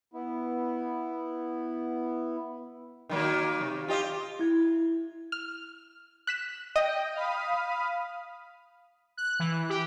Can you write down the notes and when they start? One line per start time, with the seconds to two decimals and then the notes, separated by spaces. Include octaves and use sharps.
0.14 B3 E4
3.09 D#3 F#3 A#3
3.61 C3
3.88 F4 G4 D#5
4.39 E4 G#6
5.32 F6
6.27 F#6 B6 E7
6.76 D#5 G5
7.15 F5 B5 D#6
9.17 F#6
9.39 E3
9.70 G4